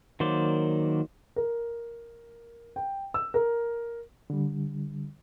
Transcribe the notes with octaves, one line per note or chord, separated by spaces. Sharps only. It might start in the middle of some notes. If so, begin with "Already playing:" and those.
D#3 F#3 A#3 C5 D5
A#4
G5
E6
A#4
D3 G3